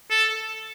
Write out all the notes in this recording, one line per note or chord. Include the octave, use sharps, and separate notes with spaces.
A4